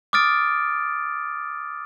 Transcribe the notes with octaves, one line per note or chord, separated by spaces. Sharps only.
D6 D#6 F6 A6 D7